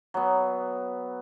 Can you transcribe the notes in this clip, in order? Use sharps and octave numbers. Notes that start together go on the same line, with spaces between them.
F#3 B3